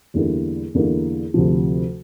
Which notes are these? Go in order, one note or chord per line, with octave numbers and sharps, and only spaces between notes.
E2 D3 G3 A#3 E4
E2 D3 G3 A#3 E4
D2 C3 F3